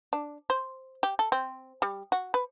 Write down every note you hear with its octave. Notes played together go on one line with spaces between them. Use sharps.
D4
C5
G4
A4
C4
G3
F#4
B4